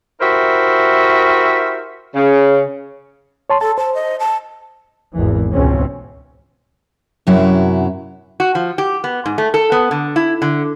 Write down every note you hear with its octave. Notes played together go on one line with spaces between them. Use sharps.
E4 F#4 G4 A#4 C5 E5
C#3
C#5 A5 C6
A4 A5
C5 A5
D#5
A5
G#1 E2 E3
C#2 G#2 B2 E3 C4 C#4
F#2 C3 F#3 C#4 E4
F#4
F3
G4
B3
G#2
A3
A4
B3
D3
E4
D3